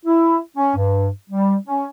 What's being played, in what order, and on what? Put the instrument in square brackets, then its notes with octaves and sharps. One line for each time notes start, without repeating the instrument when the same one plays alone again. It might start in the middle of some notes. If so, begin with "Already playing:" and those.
[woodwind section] E4
C#4
G2
G3
C#4